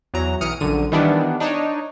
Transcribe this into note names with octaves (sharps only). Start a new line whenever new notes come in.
E2 F#3 A#5
B1 E3 D#6 F6 C#7 D7
A#1 F#2 D3 D#7
D#3 E3 G3 B3 D4
D4 D#4 C#5